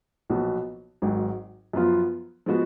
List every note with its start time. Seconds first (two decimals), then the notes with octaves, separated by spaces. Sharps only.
0.30 B1 A#2 F3 B3 F#4
1.02 G#1 G#2 F#3
1.73 F#2 F3 B3 F4
2.46 F3 G#3 B3 F#4